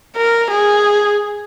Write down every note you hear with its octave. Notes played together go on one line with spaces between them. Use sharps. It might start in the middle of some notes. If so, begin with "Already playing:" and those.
A#4
G#4